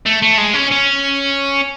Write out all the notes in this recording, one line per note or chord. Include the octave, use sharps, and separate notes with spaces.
A3
A3
G#3
C#4
C#4